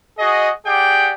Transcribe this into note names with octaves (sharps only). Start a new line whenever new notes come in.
F#4 G#4 D#5
G4 G#4 D5 F#5 G5